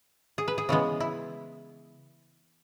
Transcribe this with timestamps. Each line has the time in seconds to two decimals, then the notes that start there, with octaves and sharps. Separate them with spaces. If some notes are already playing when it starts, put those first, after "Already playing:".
0.38 G#4
0.48 B4
0.58 G#4
0.69 C#3 E3 G#3 B3
1.00 E4